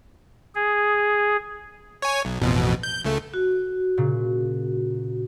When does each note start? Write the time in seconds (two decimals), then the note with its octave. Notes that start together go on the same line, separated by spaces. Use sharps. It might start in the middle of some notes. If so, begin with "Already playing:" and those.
0.55 G#4
2.02 C#5 G#5
2.25 B1
2.40 A1 F2 B2
2.83 G6
3.05 C#2 A3
3.34 F#4
3.97 A#2 C#3